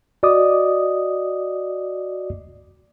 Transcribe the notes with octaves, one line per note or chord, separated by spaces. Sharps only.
F#4 D5 D#5 D6 D#6